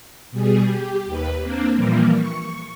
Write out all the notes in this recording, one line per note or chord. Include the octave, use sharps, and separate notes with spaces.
B2 G3 G#4
G4
D#2 B4
A#3 C4 D4
A#2 E3 F3 G3 A#3
C#6